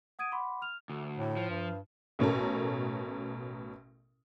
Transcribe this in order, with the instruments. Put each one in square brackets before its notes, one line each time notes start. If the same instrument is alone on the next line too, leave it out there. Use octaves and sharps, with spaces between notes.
[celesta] F#5 D#6 G#6 D7 D#7
F#5 B5 C6 D6
F6 F7
[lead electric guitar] D2
[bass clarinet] A2
[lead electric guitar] F3
[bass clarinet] G2
[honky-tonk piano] A1 B2 C#4 A4 A#4